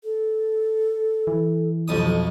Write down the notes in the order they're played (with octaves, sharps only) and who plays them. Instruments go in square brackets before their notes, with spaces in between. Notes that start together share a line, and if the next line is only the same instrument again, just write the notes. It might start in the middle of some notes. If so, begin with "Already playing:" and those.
[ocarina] A4
[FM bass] E3
[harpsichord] B1 F2 D#6